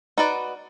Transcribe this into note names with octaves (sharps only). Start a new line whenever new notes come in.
D#4 F#4 B4 D5